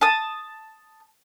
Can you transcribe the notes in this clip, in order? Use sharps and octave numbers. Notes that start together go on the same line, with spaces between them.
A5 D#6